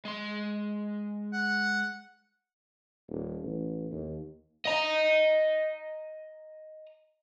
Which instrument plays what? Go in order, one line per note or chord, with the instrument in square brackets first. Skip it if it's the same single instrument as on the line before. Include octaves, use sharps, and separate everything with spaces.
[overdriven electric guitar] G#3 C6
[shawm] F#5
[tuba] D#1
A1
D#2
[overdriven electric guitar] D#5 A#5